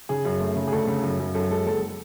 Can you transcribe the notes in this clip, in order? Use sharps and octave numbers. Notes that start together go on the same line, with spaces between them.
C#3 G#4
F#2
A3
C#3
G#4
D2 A4
C#3
F#2
F#2
F#2 A4
G#3 A4
F#1 A4